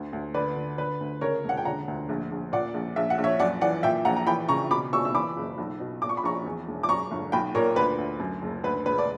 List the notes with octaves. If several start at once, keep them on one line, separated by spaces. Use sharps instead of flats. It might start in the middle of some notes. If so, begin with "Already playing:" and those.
Already playing: D2
D2
D3 B4 D5
D3
D3 B4
D2
C#3 A#4 C#5
E1
F#5
G5
D3 F#5 A#5
D2
A#1
A#1
A#2 D5 F#5
A#1
A#1 E5
F#5
A#1
C#5 E5
F#2 D5 F#5
E3 D5 F#5
A#2 E5 G5
A#1 F#5 A#5
A#5
E3 G5 B5
C#3 A#5 C#6
B2 B5 D6
B2 C#6 E6
E6
E3 B5 D6
F#1
B1
B2
A#2 D6
C#6
B5
A#1 A#5 C#6
E2
E1
D6
F#2 A#5 C#6
G1
B1 G5 B5
A#2 A#4 C#5
D2 B4
D2
F#2
F#1
D2 B4
E1 B4
D5